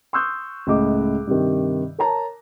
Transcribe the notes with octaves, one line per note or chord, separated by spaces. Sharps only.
C6 C#6 D#6 E6 F#6 G6
C#2 A2 D#5 D6
G2 C3 D#3
A#4 C#5 A5 A#5